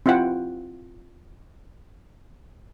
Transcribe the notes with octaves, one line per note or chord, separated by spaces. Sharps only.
C4 E4 F4 C5 F#5 G5